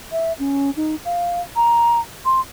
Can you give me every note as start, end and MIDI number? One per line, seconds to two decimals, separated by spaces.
0.12 0.33 76
0.39 0.71 61
0.76 0.95 63
1.05 1.41 77
1.56 2.00 82
2.25 2.41 84